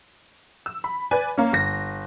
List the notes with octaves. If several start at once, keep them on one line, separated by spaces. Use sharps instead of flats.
E6
B5
B4 D5 G#5
A#3 C#4
G1 A#6